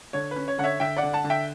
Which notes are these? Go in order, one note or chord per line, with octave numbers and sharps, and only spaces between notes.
D3 C#5
B4
C#4
C#5
D3 F#5
C#5 E5
D3 E5 G5
D5 F#5
D3
F#5 A5
D3
E5 G5